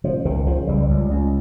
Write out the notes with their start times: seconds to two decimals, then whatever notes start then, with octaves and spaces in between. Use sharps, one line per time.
0.04 C#3 F3
0.25 C#2 D#3
0.47 C#3 F3
0.67 C#2 G3
0.89 C#2
1.11 C#2